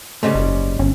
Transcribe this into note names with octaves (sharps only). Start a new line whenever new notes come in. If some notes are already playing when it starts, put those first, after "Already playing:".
G#2 C#3 G3 A3
F#1
G1 C#4